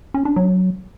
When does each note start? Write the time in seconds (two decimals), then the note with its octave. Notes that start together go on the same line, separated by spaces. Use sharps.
0.14 C#4
0.25 D4
0.36 F#3